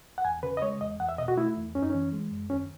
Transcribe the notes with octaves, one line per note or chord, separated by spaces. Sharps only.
F#5
E2 G#5
C#3 B4
D#5
G#3 C#5
E2 D#5
E2 F#5
E5
B2 D#5
F#4
A3 E4
E2
F#2 C#4
D#4
E3 C#4
G#3
F#2
D#2 C#4